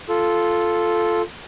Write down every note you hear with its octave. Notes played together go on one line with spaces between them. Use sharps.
F4 A4